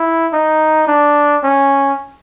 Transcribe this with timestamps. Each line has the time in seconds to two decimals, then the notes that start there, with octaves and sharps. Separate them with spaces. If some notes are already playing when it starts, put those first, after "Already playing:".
Already playing: E4
0.33 D#4
0.88 D4
1.44 C#4